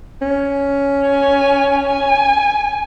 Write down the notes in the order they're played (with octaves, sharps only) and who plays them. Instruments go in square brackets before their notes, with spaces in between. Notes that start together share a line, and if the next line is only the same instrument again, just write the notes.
[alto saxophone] C#4
[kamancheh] G#5
G#5